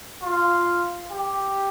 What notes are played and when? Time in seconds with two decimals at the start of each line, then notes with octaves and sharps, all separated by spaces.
0.22 F4
1.11 G4